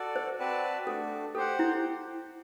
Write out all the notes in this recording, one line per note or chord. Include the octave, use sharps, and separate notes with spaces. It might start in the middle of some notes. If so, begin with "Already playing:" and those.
Already playing: F#4 A4 D5
C5
C4 F#4 B4 D5 A5
A3 D4 F#4 A4
G4 A4 C5 F#5
E4